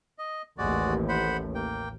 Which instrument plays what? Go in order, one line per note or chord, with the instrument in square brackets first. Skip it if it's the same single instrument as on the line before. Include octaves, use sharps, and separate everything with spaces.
[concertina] D#5
[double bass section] A1 D#2 [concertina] G#3 F#4 D5
[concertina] C5 F#5 B5
A#3 G5